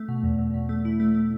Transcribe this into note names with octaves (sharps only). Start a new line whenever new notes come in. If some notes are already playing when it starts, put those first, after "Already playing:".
Already playing: A3
B2
E2
E2
B2
A3
E4
A3
A3